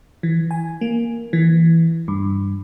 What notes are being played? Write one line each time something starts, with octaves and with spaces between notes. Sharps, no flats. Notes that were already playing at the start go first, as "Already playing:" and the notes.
E3
G#5
A#3
E3
G2